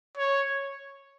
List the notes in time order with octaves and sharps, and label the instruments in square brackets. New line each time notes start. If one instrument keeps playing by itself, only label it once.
[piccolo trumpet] C#5